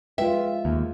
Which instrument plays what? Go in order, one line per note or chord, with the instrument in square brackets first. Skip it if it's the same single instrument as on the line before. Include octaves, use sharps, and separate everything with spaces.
[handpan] G#3 F4 [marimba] B4 G5 [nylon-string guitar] E5
[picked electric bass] D#2